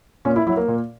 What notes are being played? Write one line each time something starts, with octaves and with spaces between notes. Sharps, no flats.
A#2 C#4
E4
F#3 E4
A#3
A#2